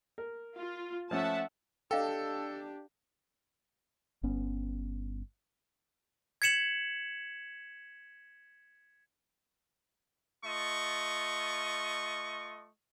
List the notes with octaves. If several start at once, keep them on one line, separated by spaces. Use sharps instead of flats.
A#4
F4
F3 A3 C#4 E5 F#5 A5
D4 G4 A4 D#5 F5 G5
G1 G2 B3 C#4
G#6 B6 C#7 E7 F#7
A3 F4 D#5 C#6